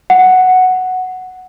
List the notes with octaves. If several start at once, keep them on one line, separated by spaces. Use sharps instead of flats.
F#5